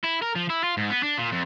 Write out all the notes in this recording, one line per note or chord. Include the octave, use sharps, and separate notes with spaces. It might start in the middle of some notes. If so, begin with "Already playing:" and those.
E4
A#4
F3
E4
F4
G#2
B3
D4
A#2
F2